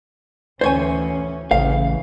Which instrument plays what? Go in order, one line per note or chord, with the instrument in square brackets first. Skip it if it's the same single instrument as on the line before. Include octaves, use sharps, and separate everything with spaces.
[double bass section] D2 E3 C#4 [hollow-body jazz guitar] C5 C#5 G#5
[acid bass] A1 [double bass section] C#3 E3 [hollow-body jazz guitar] F5